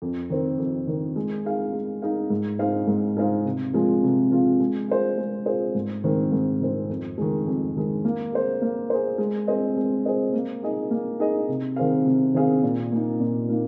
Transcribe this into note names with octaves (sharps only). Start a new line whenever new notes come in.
F2
D#3 C4
F2
D#3 C4
G#3
D#4 G#4 F5
G#3
D#4 G#4 F5
G#2
G#3 D#4 C5 F5
G#2
G#3 D#4 C5 F5
C3
F3 G#3 F4
C3
F3 G#3 F4
G#3
F4 G#4 C5
G#3
F4 G#4 C5
G#2
D#3 G#3 C4
G#2
D#3 G#3 C4
F2
D#3 G#3
F2
D#3 G#3
A#3
G#4 C5
A#3
G#4 C5
G#3
C4 G#4 C5 D#5
G#3
C4 G#4 C5 D#5
A#3
D#4 G#4 D#5
A#3
D#4 G#4 D#5
C3
D#3 C4 G#4 F5
C3
D#3 C4 G#4 F5
A#2
A#3 D#4
A#2
A#3 D#4